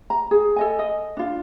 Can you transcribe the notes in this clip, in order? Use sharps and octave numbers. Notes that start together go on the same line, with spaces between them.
A#5
G#4
A4 D#5 G#5
D#5
D4 F4